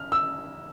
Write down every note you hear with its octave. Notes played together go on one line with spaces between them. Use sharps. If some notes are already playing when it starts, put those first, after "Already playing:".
Already playing: F6
E6